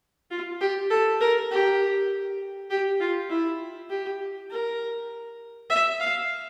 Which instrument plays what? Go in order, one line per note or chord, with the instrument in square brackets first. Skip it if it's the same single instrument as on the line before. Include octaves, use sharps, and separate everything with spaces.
[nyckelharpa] F4
G4
A4
A#4
G4
G4
F4
E4
G4
A#4
E5
F5